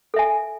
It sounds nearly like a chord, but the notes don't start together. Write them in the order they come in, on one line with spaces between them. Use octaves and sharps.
A4 E5 G#5